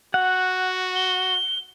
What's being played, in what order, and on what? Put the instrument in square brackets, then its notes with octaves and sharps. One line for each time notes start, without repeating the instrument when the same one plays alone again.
[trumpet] F#4 [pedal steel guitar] F#5
[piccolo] G7